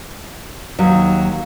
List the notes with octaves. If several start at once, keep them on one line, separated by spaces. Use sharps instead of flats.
D#2 F#3